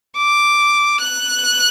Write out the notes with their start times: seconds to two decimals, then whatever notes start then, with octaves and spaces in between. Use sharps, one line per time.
0.17 D6
1.02 F#6